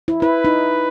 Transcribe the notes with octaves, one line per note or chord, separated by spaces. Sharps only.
E4
E4 B4
D#4